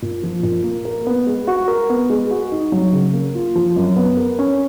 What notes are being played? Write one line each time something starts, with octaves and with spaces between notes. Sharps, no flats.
A#2
F3
A#2
A#3
A#4
B3
G#3
F#4
A#4
B3
G#3
F#4
D#4
F#3
C#3
A#3
F4
F3
F#2
B3
A#4
C#4